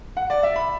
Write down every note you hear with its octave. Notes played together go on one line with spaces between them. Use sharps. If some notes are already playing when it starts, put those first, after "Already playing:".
F#5
D5
E5
B5